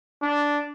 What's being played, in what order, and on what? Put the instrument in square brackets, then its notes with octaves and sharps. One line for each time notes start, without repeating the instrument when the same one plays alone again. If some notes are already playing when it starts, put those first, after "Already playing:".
[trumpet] D4